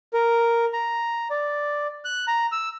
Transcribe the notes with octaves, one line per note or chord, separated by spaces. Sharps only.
A#4
A#5
D5
F#6
A#5
E6